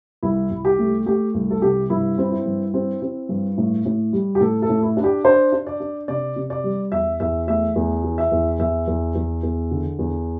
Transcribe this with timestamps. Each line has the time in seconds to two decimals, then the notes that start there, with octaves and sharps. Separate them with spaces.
0.23 C2 E4
0.50 C2
0.65 G4
0.79 A3
1.06 A3 G4
1.34 C2
1.51 A4
1.62 C3 G4
1.90 G2 E4
2.18 C4
2.32 E4
2.46 G2
2.74 C4
3.02 C4
3.29 G2
3.58 A2
3.86 A2
4.13 G3
4.35 G4
4.41 A2 A4
4.62 A4
4.69 A2
4.83 E4
4.97 D4
5.04 G4
5.24 D4 C5
5.52 D4
5.67 D5
5.80 D4
6.08 C3 D5
6.36 C3
6.50 D5
6.64 G3
6.92 E2 E5
7.20 E2 E5
7.48 A3 E5
7.76 E2
8.04 E3
8.18 E5
8.32 E2
8.59 E2 E5
8.87 E2
9.15 E2
9.43 E2
9.71 D3
9.99 E2